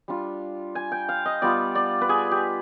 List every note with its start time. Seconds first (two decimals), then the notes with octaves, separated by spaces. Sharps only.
0.08 G3 D4 F4
0.75 G#5
0.92 G5
1.09 F5
1.25 D#5
1.42 G3 B3 F4 D5
1.75 D5
2.01 B4
2.09 G#4
2.31 G4